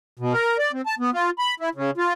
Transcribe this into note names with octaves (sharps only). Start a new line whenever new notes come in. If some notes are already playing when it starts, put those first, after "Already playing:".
B2
A#4
D5
C4
A5
B3
F4
B5
E4
C#3
F4